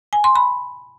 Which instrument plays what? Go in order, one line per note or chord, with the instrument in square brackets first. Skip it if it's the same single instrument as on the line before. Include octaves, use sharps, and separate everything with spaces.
[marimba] G#5
C6
B5